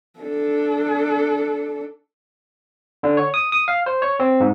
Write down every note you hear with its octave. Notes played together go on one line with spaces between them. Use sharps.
D4 A4
D3
C#5
D#6
D#6
F5
C5
C#5
C4
G#2